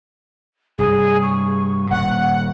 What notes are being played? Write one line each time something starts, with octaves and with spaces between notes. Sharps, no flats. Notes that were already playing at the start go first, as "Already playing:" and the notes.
G2 C3 G3 G#4
C#6
D#1 A#2 G3 F#5